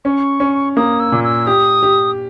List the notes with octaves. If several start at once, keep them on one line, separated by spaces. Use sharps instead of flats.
C#4 C#6
C#4
A#3 D#6
E6
A#2
E6
G4 D#6
G4